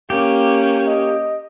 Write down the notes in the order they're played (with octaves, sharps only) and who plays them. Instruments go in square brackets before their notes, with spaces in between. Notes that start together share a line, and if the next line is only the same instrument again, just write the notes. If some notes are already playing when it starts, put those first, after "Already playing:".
[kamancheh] A#3 C#4 [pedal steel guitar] G4
[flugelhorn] D#5